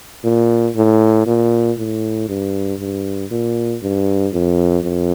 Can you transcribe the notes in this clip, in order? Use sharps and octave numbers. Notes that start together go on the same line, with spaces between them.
A#2
A2
A#2
A2
G2
G2
A#2
G2
F2
F2